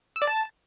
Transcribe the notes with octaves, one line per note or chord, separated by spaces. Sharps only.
E6
D5
A5